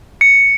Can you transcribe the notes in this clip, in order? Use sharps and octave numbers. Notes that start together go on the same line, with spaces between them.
C#7